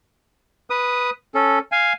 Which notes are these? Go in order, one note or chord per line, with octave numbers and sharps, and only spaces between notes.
B4 D#6
C#4 A4
F5 G#5